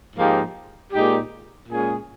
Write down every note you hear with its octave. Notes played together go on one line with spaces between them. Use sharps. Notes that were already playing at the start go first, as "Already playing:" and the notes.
G#2 F3 A#3 D#4 G4
A#2 G#3 D#4 G4
A#2 G#3 C#4 G#4